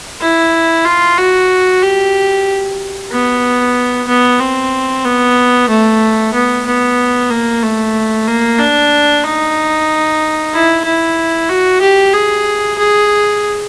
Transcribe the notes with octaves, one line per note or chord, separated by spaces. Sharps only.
E4
F4
F#4
G4
B3
B3
C4
B3
A3
B3
B3
A#3
A3
A#3
D4
D#4
E4
E4
F#4
G4
G#4
G#4